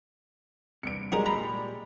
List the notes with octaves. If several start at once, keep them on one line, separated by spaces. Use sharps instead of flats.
G2 C3 C#7 D7
G3 G#3 F#4 G#4 A#4
A#2 A#5 B5